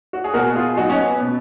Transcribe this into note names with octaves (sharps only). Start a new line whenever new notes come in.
F#4
G#4
B2 F#4 A#4
F4 G#4
F#3 D#4 F#4
C#4
B3
B2